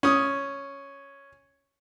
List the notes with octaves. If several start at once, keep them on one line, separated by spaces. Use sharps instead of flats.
C#4 D#6